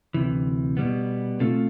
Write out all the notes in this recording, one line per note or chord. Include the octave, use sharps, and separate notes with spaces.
D2 C3 E3
B2 G3 B3
B2 A3 C4 F4 A4